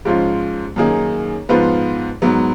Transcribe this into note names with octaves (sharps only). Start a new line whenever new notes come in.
G#2 F3 G#3 C#4 F4
F#2 D#3 A#3 D#4 G#4
G#2 F3 B3 F4 B4
G#2 F#3 B3